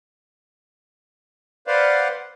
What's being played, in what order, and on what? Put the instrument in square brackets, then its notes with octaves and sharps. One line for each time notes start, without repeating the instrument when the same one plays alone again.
[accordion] B4 C5 D5 F5 F#5